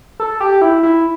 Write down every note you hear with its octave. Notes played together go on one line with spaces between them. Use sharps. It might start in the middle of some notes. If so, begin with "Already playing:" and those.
A4
G4
E4
E4